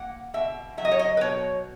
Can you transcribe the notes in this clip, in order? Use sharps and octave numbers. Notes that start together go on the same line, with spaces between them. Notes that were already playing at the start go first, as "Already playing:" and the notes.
Already playing: A#3 F#5
B2 E5
F#3 E5
D#5
C#5
D#5
B4
B2 C#5